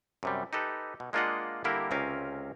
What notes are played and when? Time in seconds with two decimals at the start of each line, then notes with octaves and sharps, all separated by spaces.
0.23 F#2 C3 G3
0.53 D#4 G4 A4 B4
1.00 B2
1.13 G#3 A#3 D4 F4 D#5 F#5
1.64 D3 G3 A#3 E4 G4 A#4
1.91 C#2 C3 C4 C#4 A#4 F5